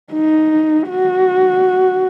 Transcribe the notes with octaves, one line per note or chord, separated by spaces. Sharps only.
D#4
F#4